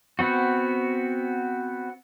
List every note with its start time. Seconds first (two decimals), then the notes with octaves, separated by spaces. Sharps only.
0.19 B3 C4 F#4